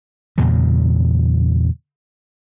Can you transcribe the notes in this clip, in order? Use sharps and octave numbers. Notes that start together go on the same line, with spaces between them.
E2 A#2 C#3 F#3